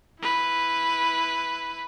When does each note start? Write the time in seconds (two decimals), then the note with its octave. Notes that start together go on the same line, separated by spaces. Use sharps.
0.20 E4 B4